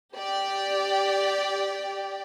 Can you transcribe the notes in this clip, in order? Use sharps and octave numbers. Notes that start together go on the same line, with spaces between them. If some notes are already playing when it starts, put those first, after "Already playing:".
G4 D5 G5